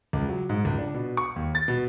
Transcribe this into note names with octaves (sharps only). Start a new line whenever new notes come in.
C#2
F#3
G#2
C#2
D4
B2
C#6
D#2
A6
B2